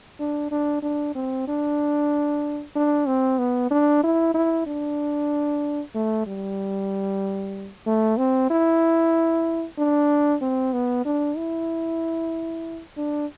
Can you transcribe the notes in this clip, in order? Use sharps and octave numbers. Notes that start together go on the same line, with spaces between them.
D4
D4
D4
C4
D4
D4
C4
B3
D4
E4
E4
D4
A3
G3
A3
C4
E4
D4
C4
B3
D4
E4
D4